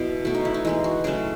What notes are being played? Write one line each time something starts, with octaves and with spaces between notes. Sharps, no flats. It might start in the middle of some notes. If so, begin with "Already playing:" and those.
Already playing: B2 F#3 E4
B2 A3 F#4
D#4
E4
D#4
E3 G#3 B3 D#4
F#4
C#3 F#3 A3 G#4